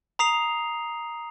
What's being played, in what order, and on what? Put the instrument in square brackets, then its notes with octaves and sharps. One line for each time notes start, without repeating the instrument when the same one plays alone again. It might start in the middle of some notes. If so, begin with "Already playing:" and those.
[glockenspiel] A#5 D#6 C7 F7